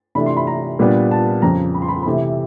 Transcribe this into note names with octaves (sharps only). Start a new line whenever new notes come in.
C3 E3 A3 D4 B5
C6
B5
A#5
A#2 G3 B3 D4
A5
F2 C#3 F3 A#5
B5
C6
B5
C6
C3 E3 A3 B5